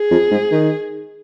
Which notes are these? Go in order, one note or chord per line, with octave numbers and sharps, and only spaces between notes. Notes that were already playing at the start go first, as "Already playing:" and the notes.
Already playing: G#4
F2
G#2
D#3